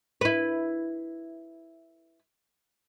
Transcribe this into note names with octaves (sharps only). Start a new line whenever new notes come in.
E4 B4